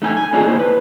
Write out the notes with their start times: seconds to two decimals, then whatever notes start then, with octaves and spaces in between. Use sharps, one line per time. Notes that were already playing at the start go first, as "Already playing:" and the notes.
0.02 A3 D#4 G5 G#5
0.17 G#5
0.33 A3 A#3 D4 D#4 F4 G#4
0.45 A#3 E4 C5
0.59 B4